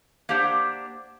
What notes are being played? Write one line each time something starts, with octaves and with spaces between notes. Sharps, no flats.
A#3 D4 G4 C5 F#5